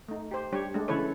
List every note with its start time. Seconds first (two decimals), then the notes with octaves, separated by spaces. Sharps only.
0.08 A3 D#4
0.31 G4 C5
0.52 G3 D4 G4 C#5
0.74 G#3 A3 D4
0.88 C#3 E3 E4 A4 B4 C#5